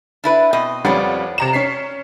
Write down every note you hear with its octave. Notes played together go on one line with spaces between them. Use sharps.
D4 E4 B4
B2 C4 D#5
F2 G3 C#4 B4 D5 F#5
C3 A#5 E7
C#4 B6 C7